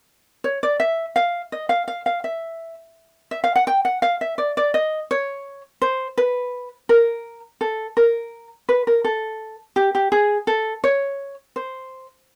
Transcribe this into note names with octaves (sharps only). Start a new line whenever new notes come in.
C#5
D5
E5
F5
D#5
F5
F5
F5
E5
E5
F5
F#5
G5
F#5
F5
E5
D5
D5
D#5
C#5
C5
B4
A#4
A4
A#4
B4
A#4
A4
G4
G4
G#4
A4
C#5
C5